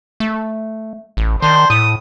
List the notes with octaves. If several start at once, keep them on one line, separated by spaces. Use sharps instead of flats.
A3
A1
D#3 D4 C5
A2 D#6